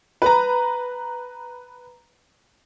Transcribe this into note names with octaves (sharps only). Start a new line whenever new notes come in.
B4 A#5